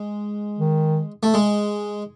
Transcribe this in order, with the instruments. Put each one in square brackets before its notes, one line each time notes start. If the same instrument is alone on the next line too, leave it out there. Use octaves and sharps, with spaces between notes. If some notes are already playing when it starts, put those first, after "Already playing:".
Already playing: [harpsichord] G#3
[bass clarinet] D#3
[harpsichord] A3
G#3